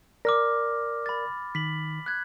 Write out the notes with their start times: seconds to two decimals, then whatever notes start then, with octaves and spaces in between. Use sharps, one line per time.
0.25 A#4 D5 D6 F6 A#6
1.06 B5 A6
1.55 D#3 B6 F#7
2.06 F#6 G#6